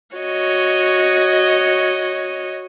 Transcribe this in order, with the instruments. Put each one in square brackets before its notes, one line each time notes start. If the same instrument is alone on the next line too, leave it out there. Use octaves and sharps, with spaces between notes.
[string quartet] F#4 C#5 D#5